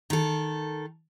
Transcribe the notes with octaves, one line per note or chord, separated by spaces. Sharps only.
D#3 A4